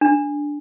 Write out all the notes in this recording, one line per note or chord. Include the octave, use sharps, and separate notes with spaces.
D4